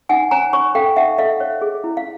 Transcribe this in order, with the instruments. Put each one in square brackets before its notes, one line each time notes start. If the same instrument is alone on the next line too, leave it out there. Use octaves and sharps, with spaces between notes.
[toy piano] D#4 F#5 G#5
C#5 G#5 A#5
C#5 B5 C#6
A4 F5 G5
D#4 E5 F#5
A4 D#5 F5
C#5
G#4
E4
F5